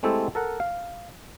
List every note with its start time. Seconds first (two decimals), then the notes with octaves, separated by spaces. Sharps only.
0.03 G#3 A3 C4 E4 G4 A4
0.35 A4 A#4 F#5
0.60 F5